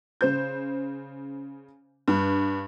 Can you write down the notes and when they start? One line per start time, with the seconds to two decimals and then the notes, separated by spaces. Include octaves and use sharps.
0.21 C#3 C5 G6
2.08 G2